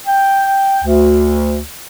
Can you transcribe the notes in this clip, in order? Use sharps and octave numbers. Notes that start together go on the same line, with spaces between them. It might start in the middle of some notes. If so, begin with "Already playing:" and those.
G5
D2